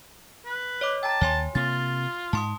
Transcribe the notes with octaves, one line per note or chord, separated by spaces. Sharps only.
B4
C#5 D#5 D6
G5 A5 A#5
D#2 C#5 G#5 C6
C3 A#3 F4 A6
G#2 A5 C6 D#6